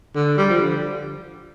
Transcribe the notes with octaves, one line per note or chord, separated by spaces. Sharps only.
D3
G3
F3
D3